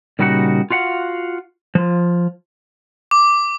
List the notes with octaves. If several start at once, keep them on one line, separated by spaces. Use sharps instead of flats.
A#2 C#3 G3 D#4 F#4 F#5
F4 F#4 F5 F#5
F3 F4
D6